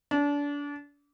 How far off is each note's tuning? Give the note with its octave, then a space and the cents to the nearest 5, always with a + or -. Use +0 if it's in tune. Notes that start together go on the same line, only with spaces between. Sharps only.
D4 -30